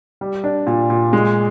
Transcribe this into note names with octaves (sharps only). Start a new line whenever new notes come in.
G3
D4
A#2
A#2
G#3